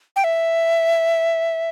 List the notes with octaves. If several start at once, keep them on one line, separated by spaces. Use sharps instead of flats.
G5
E5